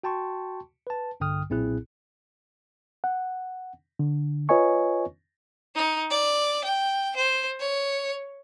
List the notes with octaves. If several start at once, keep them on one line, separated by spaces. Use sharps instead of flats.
F#4 G5 A5 C6 C#6
B4 A5
A#1 G2 D3 G5 D#6 F6
B1 A#2 C4 E4 G#4 F#6
F#5
D3
F4 B4 C#5 D#5 G#5 C#6
D#4
D5
G5
C5
C#5